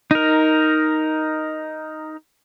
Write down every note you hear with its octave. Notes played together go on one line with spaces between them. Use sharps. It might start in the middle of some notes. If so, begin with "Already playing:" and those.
D#4 A#4